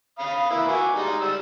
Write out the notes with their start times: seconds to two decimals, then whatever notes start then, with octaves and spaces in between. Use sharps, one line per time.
0.19 F5 B5 D#6
0.51 A#3 E4 B4
0.68 F#4 G#5 D6
0.94 G3 G#3 D#4
1.20 G3 E6